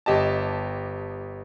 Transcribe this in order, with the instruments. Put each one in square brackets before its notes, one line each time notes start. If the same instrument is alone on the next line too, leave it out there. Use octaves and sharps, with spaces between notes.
[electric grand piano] G1 G4 D#5 A5